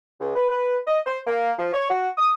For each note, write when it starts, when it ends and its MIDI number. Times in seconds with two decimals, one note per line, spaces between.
0.20 0.34 37
0.36 0.49 71
0.50 0.77 71
0.87 1.00 75
1.06 1.19 72
1.27 1.52 58
1.59 1.72 53
1.73 1.87 73
1.90 2.09 66
2.18 2.34 87